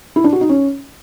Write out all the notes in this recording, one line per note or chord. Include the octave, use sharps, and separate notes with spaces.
E4
D4
F#4
D#4
C#4